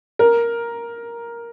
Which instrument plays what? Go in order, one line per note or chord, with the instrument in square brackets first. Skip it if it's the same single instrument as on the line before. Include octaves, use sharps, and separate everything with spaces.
[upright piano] A#4